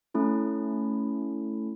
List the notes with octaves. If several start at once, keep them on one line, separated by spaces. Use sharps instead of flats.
A3 C#4 E4 A4